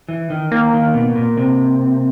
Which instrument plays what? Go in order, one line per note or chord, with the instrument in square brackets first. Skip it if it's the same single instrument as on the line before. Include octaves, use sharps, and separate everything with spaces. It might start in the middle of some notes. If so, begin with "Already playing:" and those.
[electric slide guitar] E3
D#3
[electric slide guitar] D#3 [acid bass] A#3
[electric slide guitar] D#3
B2
A#2
C3